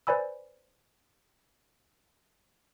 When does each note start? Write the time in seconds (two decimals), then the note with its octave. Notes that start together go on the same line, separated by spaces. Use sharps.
0.07 B4 C5 D5 G#5 B5 E6